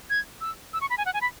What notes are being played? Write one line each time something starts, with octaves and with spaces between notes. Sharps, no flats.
G#6
E6
E6
C#6
B5
G#5
F#5
G#5
B5